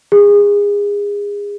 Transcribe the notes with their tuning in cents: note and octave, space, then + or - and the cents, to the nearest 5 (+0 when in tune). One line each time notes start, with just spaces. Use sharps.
G#4 -30